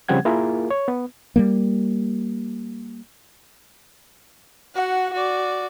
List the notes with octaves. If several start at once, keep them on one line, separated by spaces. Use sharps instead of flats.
C#3 F3 G3 C4 F#5 G#6
A#3 E4 F4 G#4 A#4
C#5
B3
G3 G#3 A#3
F#4 F#5
F#4 D5